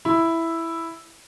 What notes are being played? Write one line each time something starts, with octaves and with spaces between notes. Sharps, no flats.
E4